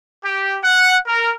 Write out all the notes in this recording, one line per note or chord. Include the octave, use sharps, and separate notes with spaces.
G4
F#5
A#4